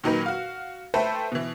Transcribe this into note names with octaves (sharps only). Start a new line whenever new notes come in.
A#2 D#3 F#3 D#4 A#4 B4
F#4 F5
A3 A4 B4 C5 E5 G5
B2 E3